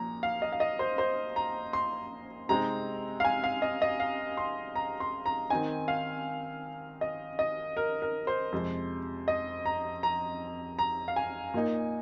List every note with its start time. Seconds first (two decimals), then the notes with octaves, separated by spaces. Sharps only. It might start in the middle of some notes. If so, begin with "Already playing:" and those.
Already playing: A#2 F3 A#5
0.23 F5
0.42 D#5
0.52 F5
0.60 D#5
0.79 C5
0.98 C5
1.36 A#5
1.73 C6
2.49 C3 G#3 C4 D#4 A#5
3.20 F5
3.25 G#5
3.44 F5
3.62 D#5
3.82 D#5
4.00 F5
4.37 C6
4.76 A#5
5.00 C6
5.26 A#5
5.50 D#3 C4 D#4 G#5
5.88 F5
7.01 D#5
7.39 D#5
7.77 A#4
8.02 A#4
8.27 C5
8.52 F2 C3 G#3
9.28 D#5
9.66 A#5
10.03 A#5
10.79 A#5
11.08 F5
11.16 G#5
11.54 A#2 A#3 D#4